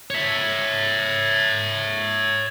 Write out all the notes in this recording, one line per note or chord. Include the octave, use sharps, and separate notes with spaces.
C#5 E5